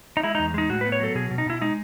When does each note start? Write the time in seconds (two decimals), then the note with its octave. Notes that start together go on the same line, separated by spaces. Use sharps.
0.17 D#4
0.23 G#3 E4
0.35 E2 D#4
0.54 G#3 D#4
0.69 A2 F#4
0.81 B3 B4
0.92 C#5
1.00 F#3 A4
1.15 B2 G#4
1.31 B2
1.38 D#4
1.46 B2 E4
1.61 G#3 D#4